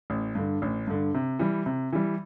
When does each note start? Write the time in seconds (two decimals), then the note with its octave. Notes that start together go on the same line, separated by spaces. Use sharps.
0.10 A1
0.35 G2 D3
0.62 A1
0.87 G2 D3
1.14 C3
1.39 E3 G3
1.66 C3
1.93 E3 G3